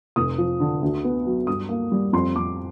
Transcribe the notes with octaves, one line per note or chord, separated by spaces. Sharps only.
F1 D#6
F3
D3
D2
B3
F#3
G2 D#6
A#3
G3
F2 C6
F2 D6